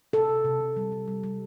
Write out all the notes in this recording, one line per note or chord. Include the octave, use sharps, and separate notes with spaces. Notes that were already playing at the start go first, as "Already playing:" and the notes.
C3 A4
C3
C3
C3
G3
G3
G3
G3